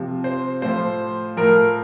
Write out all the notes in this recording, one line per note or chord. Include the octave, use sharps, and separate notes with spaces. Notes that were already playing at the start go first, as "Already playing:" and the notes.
Already playing: C3 F3
C5
A2 F3 C5
A2 F3 A#4